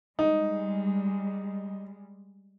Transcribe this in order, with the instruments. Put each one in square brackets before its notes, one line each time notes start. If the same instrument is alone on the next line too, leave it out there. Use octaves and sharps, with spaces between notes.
[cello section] G3 G#3 [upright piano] D#4